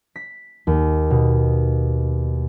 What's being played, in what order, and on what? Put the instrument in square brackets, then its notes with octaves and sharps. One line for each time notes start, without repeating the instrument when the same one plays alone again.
[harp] B6
D#2
B2